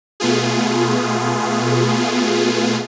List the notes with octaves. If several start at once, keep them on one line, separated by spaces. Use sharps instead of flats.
B2 A3 B3 F4 G#4